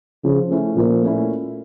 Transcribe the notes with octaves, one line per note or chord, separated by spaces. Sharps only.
C#3 F3
A3 C#4 E4
A#2 F3
A3 C#4 E4